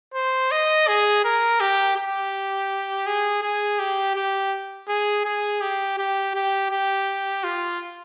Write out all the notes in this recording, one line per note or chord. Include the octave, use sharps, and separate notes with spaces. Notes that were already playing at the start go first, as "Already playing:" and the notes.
C5
D#5
G#4
A#4
G4
G4
G#4
G#4
G4
G4
G#4
G#4
G4
G4
G4
G4
F4